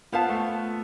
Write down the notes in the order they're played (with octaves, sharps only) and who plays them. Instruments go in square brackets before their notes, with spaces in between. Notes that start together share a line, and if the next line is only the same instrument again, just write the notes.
[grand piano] B3 [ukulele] F4 C5 F5 A5
[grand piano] A3